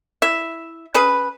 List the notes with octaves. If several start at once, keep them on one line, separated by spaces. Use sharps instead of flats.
E4 E5
C#3 G#4 B4